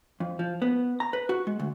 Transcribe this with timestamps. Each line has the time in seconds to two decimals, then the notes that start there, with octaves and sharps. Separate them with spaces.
0.20 F2
0.39 F3
0.62 B3
1.00 A#5
1.13 B4
1.29 F#4
1.47 G#3
1.59 D2